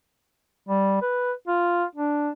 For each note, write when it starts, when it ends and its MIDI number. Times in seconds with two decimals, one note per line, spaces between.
0.69 1.00 55
1.02 1.32 71
1.48 1.84 65
1.95 2.30 62